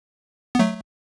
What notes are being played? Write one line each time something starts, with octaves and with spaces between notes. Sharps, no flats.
B3
F#3 A3